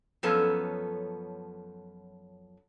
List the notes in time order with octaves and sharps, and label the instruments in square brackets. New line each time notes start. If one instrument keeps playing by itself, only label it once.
[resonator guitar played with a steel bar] F#2 F3 B3 C#4 A4